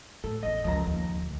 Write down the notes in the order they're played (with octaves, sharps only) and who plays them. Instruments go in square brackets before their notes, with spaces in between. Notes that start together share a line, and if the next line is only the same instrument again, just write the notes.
[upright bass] A2 [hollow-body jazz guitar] A4
[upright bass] A1 E2 [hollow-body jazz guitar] D#5
[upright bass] C#2 F#2 [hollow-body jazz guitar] F3 A#5
[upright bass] D#2
D2